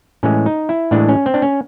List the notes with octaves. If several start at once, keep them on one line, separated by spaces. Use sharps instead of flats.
A2 E3 G#3 C#4
D#4
E4
A2 E3 G#3 D4
C#4
C4
D4
C#4